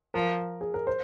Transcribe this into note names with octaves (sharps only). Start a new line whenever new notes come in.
F3 A#4
G#4
A#4
C5